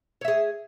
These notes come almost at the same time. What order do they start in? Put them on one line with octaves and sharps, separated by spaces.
C#5 E5 G#4